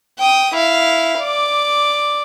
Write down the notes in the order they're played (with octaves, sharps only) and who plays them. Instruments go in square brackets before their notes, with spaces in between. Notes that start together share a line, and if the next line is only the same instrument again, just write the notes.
[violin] G5 D#6
E4 F5
D5 D6